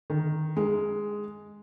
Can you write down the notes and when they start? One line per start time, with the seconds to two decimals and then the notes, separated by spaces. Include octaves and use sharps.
0.10 D#3
0.57 G#3